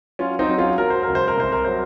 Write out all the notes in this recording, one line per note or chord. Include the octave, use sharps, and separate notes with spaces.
F#3 C#4 F4
C4 D#4
F#3
C#4 F4
F#3 A#4
C5
A#4
C#2
C5
A#4
C2 C5
A#4
F#3 C5